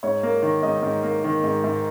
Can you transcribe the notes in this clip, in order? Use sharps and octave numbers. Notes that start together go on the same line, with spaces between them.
G#2 C#5
A#3
D#3
G#2 D#5
G#2
A#3
D#3
G#2
G#2